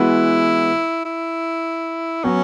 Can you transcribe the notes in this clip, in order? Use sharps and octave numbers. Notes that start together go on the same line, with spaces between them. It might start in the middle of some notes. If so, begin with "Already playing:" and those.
Already playing: E3 G#3 B3 E4 F#4 B4
E4
F#3 B3 C#4